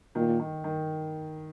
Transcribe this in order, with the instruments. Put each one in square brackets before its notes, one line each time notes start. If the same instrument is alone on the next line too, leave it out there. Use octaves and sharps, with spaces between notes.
[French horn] A#2 [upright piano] D#3
[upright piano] D#3
D#3